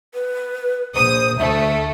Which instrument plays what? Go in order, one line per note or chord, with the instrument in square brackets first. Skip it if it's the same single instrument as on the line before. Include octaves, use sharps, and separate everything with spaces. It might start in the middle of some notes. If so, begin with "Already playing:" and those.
[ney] B4
[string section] A#1 D#6 [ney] C5
[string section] D2 A3 [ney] E5